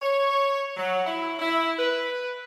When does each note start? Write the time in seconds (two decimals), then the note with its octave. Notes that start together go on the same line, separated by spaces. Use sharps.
0.02 C#5
0.77 F#3
1.05 E4
1.39 E4
1.77 B4